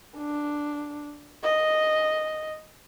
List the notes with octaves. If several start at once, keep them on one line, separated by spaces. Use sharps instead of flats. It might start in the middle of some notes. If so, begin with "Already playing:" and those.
D4
D#5